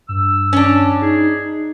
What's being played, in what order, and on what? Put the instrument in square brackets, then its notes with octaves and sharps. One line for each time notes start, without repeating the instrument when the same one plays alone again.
[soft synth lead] G2 [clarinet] E6
[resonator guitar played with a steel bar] C#4 D4
[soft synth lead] D#4 [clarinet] G#4